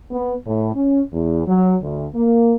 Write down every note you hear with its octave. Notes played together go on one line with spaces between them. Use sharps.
B3
A2
C#4
E2
F#3
D2
A#3